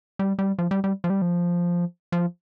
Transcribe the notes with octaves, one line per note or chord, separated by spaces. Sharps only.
G3
G3
F3
G3
G3
F3
G3
F3
F3